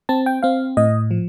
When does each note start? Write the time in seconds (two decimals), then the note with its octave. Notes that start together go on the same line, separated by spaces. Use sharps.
0.09 C4 A5
0.26 G5
0.43 C4 F5
0.77 A2 D#5
1.11 F3